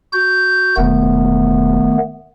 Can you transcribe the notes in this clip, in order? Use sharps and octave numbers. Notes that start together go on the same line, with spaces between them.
F#4 G6
E1 D#3 A3 B3